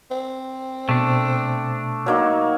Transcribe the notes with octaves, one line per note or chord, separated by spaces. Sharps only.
C4
B2 A3 D4
F#3 A#3 D#4